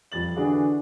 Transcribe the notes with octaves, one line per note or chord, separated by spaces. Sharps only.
F2 G3 A6 F#7
D3 E3 D4 F#4 G#4